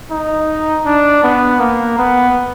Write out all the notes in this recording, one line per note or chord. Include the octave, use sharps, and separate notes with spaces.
D#4
D4
B3
A#3
B3